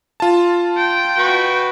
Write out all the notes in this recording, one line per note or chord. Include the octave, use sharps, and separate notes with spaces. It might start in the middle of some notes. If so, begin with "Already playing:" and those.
F4 A5
G5
F#4 B4 C#6